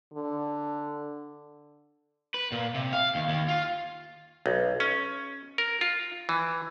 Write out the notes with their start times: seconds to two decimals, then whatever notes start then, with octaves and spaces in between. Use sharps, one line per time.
0.14 D3
2.34 B4
2.52 A#2
2.75 C3
2.93 F5
3.15 D#2
3.29 D#2
3.48 F4
4.46 B1
4.80 C#4
5.58 A#4
5.81 F4
6.29 E3